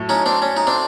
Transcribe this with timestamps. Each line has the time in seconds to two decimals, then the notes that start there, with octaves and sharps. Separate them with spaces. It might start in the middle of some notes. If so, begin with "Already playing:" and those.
Already playing: A2 F#3 A3
0.09 C#4 D#4
0.26 C4 D4
0.42 C#4
0.57 D#4
0.67 C4 D4